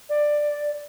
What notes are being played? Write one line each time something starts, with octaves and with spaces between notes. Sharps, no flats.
D5